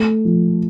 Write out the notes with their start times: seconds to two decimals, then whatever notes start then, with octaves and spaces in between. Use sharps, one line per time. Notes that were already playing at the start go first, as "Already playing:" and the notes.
Already playing: A3
0.25 F3